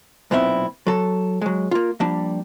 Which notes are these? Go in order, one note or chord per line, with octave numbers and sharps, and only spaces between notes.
B1 A#2 B3 C4 E4 E5
F#3 A4
F#3 G#3
A#3 F4
F3 G3 A#3 D4